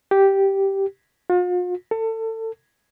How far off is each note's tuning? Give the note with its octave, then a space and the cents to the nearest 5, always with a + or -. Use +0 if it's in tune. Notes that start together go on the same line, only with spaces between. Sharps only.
G4 -5
F4 +45
A4 +25